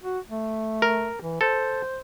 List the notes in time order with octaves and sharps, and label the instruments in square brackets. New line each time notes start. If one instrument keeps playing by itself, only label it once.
[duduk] F#4
A3
[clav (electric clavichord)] A#4
[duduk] E3
[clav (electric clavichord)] A4 [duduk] C5